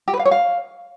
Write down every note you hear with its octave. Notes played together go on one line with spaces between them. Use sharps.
G4
B4
F5
C#5
F5